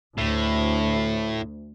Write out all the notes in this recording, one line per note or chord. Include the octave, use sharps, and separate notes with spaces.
D2 A2